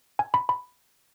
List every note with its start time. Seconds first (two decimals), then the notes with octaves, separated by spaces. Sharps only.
0.19 G#5
0.34 B5
0.49 B5